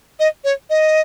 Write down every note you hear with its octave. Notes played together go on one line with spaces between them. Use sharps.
D#5
C#5
D#5